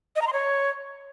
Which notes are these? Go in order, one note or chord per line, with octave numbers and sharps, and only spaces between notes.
D#5
A#5
C6
C#5